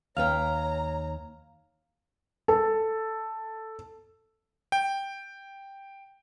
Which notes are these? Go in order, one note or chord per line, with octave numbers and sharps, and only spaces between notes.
D#2 B4 C#5 F5 G5 A#5 F6 F7
A4
G5